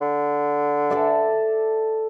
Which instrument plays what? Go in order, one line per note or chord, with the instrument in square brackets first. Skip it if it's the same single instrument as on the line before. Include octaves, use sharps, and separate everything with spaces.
[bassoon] D3
[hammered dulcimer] A4 D5 E5